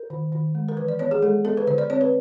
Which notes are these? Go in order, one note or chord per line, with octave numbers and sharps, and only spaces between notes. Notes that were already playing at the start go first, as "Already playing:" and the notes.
Already playing: A#4
D#3
D#3
G#3
A#4
E3 B4
D5
B3 C#5
G#4
G#3 A4
B3 A4
B4
D3 C5
D5
C4 C#5
B4